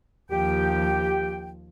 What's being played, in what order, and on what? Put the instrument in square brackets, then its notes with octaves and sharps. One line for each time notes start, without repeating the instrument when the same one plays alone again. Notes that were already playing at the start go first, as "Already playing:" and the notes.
[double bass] D#2 F3 [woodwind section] G4 G5